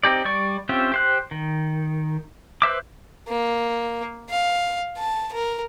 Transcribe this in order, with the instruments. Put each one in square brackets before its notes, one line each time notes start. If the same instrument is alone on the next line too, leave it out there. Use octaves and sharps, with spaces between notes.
[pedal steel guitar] C4 D#4 G4 D5
G3 D5 C#6
C4 C#4 F4 G4 E5
G4 C5 F#6
D#3
B4 C5 E5 D6
[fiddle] A#3
F5
A5
A#4